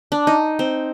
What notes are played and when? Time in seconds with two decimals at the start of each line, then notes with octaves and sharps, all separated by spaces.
0.12 D4
0.27 D#4
0.59 C4